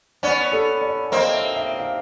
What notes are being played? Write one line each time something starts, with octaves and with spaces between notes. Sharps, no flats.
B3 C#4 D5
A4
D5
A#3 C4 D#5
E5
E5
F5